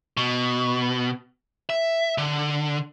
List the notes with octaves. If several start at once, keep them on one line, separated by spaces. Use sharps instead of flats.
B2
E5
D3